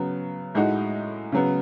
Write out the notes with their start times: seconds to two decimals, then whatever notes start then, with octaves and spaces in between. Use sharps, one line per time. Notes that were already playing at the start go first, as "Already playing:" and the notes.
Already playing: C#3 F#3 B3
0.54 A2 G#3 D#4 F#4
1.32 C#3 F#3 B3